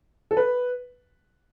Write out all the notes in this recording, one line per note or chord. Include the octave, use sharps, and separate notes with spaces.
A4
B4